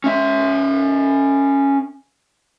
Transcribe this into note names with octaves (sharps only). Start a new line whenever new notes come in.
C#4 E5